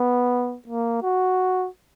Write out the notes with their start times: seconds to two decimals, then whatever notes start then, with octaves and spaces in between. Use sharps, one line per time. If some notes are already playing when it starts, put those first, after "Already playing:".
Already playing: B3
0.68 A#3
1.03 F#4